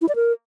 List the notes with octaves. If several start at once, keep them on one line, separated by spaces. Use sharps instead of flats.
E4
D5
A#4